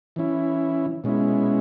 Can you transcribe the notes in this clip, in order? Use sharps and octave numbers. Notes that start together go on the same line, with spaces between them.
E3 C#4 E4
B2 G#3 C#4 E4